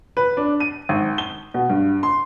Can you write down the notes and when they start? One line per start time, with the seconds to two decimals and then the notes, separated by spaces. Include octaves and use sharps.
0.17 B4
0.37 D4
0.60 D#7
0.89 G#1
1.18 G7
1.54 B2
1.69 G2
2.03 C6